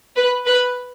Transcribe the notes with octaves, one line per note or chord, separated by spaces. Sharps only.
B4
B4